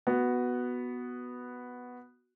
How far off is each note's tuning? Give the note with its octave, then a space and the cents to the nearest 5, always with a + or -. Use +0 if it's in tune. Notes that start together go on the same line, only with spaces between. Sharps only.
B3 +0 F#4 +0